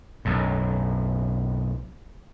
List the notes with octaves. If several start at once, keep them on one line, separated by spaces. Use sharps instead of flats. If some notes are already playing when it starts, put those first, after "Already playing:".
B1 F#2 A2